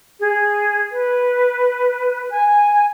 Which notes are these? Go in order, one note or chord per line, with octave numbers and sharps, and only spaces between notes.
G#4
B4
G#5